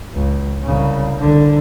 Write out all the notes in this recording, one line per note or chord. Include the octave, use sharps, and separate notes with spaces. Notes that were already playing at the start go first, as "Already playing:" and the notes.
C#2
C2 C#3
C2 D3